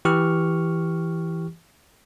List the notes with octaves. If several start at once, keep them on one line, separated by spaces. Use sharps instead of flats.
E3 G4 C#6 F6